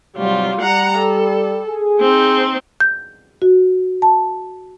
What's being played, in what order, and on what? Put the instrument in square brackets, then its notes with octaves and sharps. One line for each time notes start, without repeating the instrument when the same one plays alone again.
[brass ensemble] G#2 C3 F#3 [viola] G3 F4
[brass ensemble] G3 [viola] F#5 A#5
[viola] A4
[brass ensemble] G#4
[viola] C4 D#4
[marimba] G6
F#4
A5